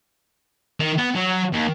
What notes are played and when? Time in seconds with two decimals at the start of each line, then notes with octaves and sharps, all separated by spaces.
0.80 D#3
0.98 B3
1.15 F#3
1.53 D#2